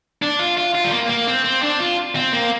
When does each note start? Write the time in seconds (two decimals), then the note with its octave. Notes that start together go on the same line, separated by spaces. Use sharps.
0.22 D4
0.39 F4
0.57 F4
0.75 F4
0.84 G3
0.92 A#3
1.10 A#3
1.27 C4
1.45 C4
1.62 D4
1.80 F4
2.16 C4
2.33 A#3